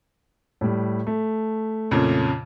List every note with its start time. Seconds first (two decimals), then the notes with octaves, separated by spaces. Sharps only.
0.61 A2 G3
1.07 A3
1.91 F2 A#2 C#3